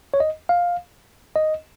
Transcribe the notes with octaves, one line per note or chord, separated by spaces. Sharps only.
C#5
D#5
F5
D#5